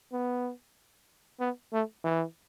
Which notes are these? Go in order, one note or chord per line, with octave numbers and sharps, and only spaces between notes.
B3
B3
A3
E3